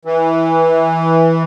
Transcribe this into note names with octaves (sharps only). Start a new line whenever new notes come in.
E3